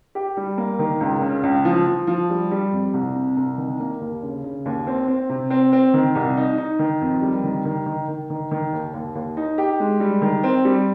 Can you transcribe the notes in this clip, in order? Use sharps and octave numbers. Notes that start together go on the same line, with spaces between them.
G4
G3
A#3
D#3
C#2
C#3
C#2
F3
F3
F3
G3
G3
F2
C2
C3
C2
D#3
A#3
D#2
C#3
C#3
D#2
C4
C4
C3
C4
C4
D#3
C2
D#4
D#4
D#3
F2
G3
D#3
D#3
D#3
D#3
D#3
D#3
D#2
D#2
D#2
D#4
G4
G#3
G3
D#3
C4
G3